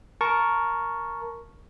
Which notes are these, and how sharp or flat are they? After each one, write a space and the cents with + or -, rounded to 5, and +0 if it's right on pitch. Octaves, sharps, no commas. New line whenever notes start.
A#4 +0 A5 -10 C#6 +0